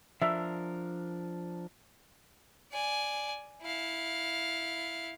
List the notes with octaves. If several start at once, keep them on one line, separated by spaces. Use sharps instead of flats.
F3 D4 A#4 E5
D5 G#5
E4 F5